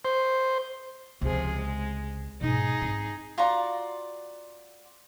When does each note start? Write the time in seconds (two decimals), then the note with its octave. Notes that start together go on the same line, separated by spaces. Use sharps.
0.05 C5
1.21 C#2 C3 F3 G#4
1.55 G#3
2.41 G#2 B2 D#4 G#4
2.82 G#2 C4
3.38 F4 F#4 D5 A#5